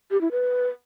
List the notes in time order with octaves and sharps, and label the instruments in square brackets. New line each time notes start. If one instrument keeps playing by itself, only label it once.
[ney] G4
E4
B4